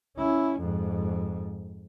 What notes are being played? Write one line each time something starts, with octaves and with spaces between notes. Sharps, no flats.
C#4 E4
F2 G#2